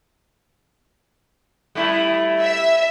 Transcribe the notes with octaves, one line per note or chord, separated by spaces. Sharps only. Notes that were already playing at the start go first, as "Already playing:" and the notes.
G3 A3 E4
E5